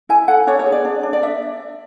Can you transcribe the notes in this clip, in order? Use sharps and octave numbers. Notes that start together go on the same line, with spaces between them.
E4 G#5
A4 F#5
D4 C#5
C#5
G#4
D5
D4
D4
D5
D4 E5